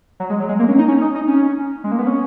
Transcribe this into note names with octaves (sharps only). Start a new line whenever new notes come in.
F#3
G#3
F#3
G#3
A#3
C#4
D#4
C#4
D#4
D#4
C#4
G#3
A#3
B3
C#4